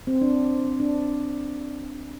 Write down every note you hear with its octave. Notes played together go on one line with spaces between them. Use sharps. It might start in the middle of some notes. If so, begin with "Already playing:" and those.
C4
D4
D4